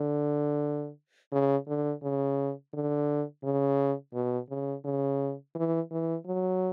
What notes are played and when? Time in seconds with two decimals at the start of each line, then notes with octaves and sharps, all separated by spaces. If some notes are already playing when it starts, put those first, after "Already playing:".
Already playing: D3
1.32 C#3
1.67 D3
2.03 C#3
2.73 D3
3.44 C#3
4.14 B2
4.50 C#3
4.85 C#3
5.55 E3
5.91 E3
6.26 F#3